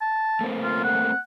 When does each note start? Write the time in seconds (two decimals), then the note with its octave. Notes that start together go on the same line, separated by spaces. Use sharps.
0.01 A5
0.41 A3 A#3 C4
0.63 F4
0.84 F#5